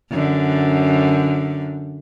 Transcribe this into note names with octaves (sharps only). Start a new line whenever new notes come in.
F#2 D3